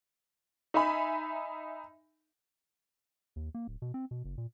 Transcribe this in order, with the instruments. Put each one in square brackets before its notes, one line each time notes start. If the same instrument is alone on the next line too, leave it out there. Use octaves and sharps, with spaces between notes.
[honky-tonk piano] D#4 E5 G#5 B5
[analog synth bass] D#2
A#3
D1
B2
C4
B2
F#1
A#2